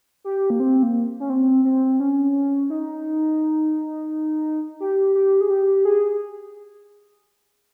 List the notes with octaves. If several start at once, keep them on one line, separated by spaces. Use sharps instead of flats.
G4
A#3
C4
A#3
C#4
C4
C4
C#4
D#4
G4
G4
G#4
G4
G#4